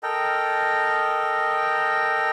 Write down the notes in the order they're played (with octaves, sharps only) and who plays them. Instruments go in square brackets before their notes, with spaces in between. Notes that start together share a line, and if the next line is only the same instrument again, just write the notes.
[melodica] A4 A#4 D#5 G5